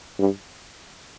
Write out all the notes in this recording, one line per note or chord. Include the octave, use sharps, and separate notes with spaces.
G2